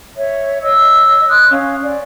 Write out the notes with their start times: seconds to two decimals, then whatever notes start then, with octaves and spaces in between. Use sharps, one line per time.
0.16 C#5 E5
0.62 C#5 D#5 E6
1.29 C6 D#6 F#6
1.51 C#4 F5
1.83 D5